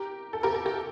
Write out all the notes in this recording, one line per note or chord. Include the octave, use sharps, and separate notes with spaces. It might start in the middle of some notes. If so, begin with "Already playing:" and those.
Already playing: G4 A#4
A4
G4 A#4
A4
G4